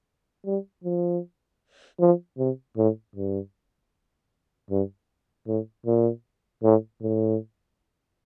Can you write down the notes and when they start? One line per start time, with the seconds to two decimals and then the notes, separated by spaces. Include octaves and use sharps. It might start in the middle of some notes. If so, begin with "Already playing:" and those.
0.45 G3
0.83 F3
2.00 F3
2.38 C3
2.77 A2
3.16 G2
4.70 G2
5.47 A2
5.86 A#2
6.63 A2
7.01 A2